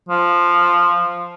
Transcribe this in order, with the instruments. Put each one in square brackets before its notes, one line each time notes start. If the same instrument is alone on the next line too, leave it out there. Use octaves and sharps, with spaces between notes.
[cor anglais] F3